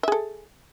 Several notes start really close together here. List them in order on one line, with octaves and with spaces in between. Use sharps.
E5 G#4 A4